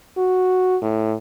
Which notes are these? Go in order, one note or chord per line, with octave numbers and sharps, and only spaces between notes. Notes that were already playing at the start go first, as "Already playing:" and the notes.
F#4
A2